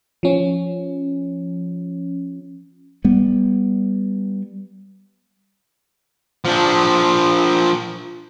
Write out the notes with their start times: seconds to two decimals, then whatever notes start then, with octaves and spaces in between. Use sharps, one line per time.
0.23 F3 C#4
3.05 G3 B3
6.45 F3 D4